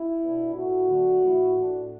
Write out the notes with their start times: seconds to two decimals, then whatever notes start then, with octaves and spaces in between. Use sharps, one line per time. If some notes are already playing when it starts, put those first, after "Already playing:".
Already playing: E4
0.22 B2 B3 D4
0.55 A2 A3 E4 F#4
0.89 D3 F#3 A3 D4
1.22 A2 E3 A3 E4
1.56 A2 A3 D4